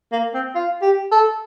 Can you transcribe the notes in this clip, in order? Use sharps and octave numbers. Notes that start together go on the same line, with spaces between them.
A#3
C4
F4
G4
A4